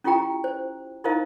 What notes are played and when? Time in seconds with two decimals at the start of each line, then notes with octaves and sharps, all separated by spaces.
0.04 C#4 E4 F4 G4 G5 A#5
0.44 C5
1.04 D#4 E4 A#4 C5 D#5 F5